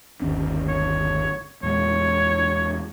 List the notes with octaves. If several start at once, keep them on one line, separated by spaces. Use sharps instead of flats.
G1 D#2 C#4
C#5
E2 A#2 G#3 C#5